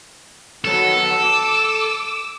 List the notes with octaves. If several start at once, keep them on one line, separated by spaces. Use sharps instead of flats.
D#3 F#3 B3 A4
D6 E6